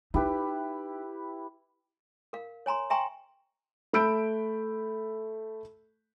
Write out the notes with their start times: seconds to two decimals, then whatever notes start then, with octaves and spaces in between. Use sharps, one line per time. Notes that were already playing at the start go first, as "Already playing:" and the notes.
0.14 D#4 E4 G4 B4
2.33 A#4 F5
2.66 C#5 G#5 A#5 C6
2.90 E5 G5 G#5 A#5 C6 C#6
3.93 A3 B5 E6 G6 D7